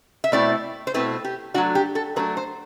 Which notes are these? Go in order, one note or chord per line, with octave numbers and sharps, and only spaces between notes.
E5
B2 A3 C4 E4 D5
C5
B2 A3 C4 E4 B4
G4
F#3 A3 D4 F#4
G4
A4
F#3 A3 D4 B4
C5